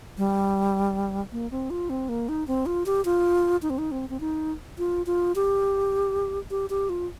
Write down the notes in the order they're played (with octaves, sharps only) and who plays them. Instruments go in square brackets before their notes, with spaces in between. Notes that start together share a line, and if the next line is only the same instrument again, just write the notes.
[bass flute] G3
A#3
C4
F4
C4
A#3
D#4
C4
F4
G4
F4
D#4
C4
D#4
C4
C4
D#4
F4
F4
G4
G4
G4
F4